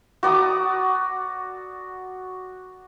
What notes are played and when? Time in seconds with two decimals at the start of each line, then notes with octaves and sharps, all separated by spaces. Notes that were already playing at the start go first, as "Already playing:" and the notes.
0.23 F#4 D5 A#5 D#6